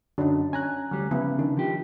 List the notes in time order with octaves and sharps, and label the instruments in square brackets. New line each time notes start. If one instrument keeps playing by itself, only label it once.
[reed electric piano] F#2 D3 F#3 [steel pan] D4 D#4
[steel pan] C#4 [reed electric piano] G#5 A#5 F#6
[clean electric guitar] D2 G3 [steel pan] F#3
[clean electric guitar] C#3 [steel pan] F3 B3 E4
[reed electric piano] D#3 [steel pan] D4
[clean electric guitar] F3 G4